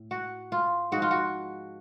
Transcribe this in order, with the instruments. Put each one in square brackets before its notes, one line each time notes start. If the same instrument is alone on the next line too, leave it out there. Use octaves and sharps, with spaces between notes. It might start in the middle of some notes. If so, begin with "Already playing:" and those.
Already playing: [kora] A2
F#4
F4
G#2 F3 F#4
F4
F#4